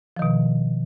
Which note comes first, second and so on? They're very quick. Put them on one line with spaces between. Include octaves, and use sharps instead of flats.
F3 D#3 B2